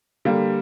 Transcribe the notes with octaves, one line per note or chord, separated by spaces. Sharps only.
D3 G3 A#3